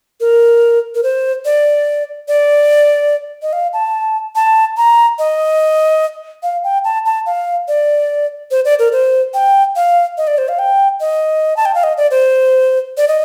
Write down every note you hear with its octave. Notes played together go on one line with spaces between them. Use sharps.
A#4
A#4
C5
D5
D5
D#5
F5
A5
A5
A#5
D#5
F5
G5
A5
A5
F5
D5
C5
D5
A#4
C5
G5
F5
D#5
D5
C5
F5
G5
D#5
A5
G5
F5
D#5
D5
C5
D5
D#5